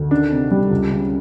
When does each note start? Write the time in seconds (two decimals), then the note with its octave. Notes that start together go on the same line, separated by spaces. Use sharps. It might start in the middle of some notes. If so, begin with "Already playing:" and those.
Already playing: D2
0.11 D#3 D4
0.31 C3
0.51 G3
0.71 C#2
0.91 C#3